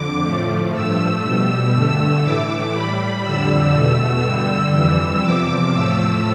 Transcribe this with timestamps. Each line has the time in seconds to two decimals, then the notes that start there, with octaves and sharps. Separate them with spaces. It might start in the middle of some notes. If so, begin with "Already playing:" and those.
Already playing: F2 D3 D6
0.24 A2 F3 A3
0.73 G2 F3 A3 E6
1.23 B2 G3 E6
1.73 G2 D3 A3
2.23 A2 E3 A3 D6
2.73 A2 G3 B5
3.23 F2 D3 G3 E6
3.72 E2 B2 A3
4.22 G2 D3 G3 E6
4.72 F2 E3 G3 E6
5.22 E2 C3 F3 D6
5.72 A2 F3 A3 E6